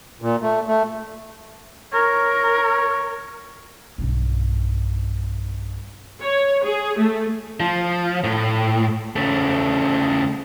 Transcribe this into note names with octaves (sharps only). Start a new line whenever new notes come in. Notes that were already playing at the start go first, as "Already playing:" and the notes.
A#2
A3
A3
A#4 C#5
B1 G2
C#5
G#4
A3
F3
A2
C#3 A3